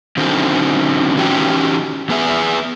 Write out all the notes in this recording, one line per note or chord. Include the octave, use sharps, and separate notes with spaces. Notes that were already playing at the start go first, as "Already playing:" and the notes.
D3 D#3 F#3 C4 C#4
D#3 E3 C#4 F#4 G4
E2 B3 G#4 E5